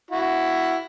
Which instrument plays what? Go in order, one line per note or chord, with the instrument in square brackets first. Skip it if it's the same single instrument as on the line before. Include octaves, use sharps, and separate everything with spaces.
[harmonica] E4 F#4